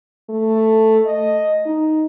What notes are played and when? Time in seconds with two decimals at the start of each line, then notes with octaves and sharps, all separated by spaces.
0.29 A3
1.06 D#5
1.66 D#4